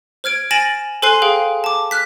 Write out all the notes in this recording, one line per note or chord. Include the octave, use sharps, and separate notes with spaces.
C5 F6 G#6 D7
G#5 A6 A#6 D7 E7 F#7
A4 C5 G#5 C6 F#6 C7
G#4 C5 F5 G5
A5 D6
F6 F#6 B6